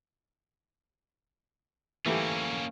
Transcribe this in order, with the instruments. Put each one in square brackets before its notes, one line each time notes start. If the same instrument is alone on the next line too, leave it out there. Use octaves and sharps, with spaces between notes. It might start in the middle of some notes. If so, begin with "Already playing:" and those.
[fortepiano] E3 A3 G4 [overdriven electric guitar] A#3 C#4